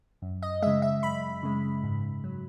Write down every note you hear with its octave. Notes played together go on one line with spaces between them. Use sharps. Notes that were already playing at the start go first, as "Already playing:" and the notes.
F#2
D#5
C#3 G#3 E5
E5
F#2 B5
C#3 G#3
G#2
F#3